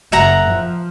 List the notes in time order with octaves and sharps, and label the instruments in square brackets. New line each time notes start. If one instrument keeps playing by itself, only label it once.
[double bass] F#1 [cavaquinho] E5 F#5 A#5
[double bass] F3